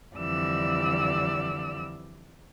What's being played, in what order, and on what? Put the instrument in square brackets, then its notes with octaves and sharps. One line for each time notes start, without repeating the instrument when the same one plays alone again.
[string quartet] F2 D3 E3 G3 D5 E6